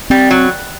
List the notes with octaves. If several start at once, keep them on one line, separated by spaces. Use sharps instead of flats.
G3 C4
F#3